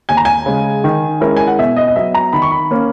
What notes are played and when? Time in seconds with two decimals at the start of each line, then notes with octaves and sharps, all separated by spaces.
0.09 D#2 G#5
0.17 A#5
0.25 G#5
0.46 C#3 G#3
0.84 D#3
1.21 G#3 C#4 E4 A#4
1.37 G#5
1.47 F#5
1.58 B2 E5
1.76 D#5
1.87 D#5
1.96 F#3 B3 E5
2.14 A#5
2.33 D#3 B5
2.42 C#6
2.51 B5
2.71 A#3 C#4